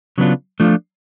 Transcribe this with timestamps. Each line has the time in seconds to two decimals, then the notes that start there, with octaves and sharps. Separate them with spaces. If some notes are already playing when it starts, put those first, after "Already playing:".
0.18 C#3 F#3 B3 D4 F4
0.60 F3 A3 D4 F4